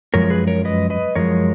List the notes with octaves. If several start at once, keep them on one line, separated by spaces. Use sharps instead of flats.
F#2 F3 G#3 A#4 C#5
G#4 B4
A#4 C#5
B4 D#5
B4 D#5
F#2 F3 G#3 A#4 C#5